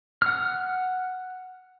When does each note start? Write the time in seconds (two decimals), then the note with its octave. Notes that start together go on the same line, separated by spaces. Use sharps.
0.22 F#5 F6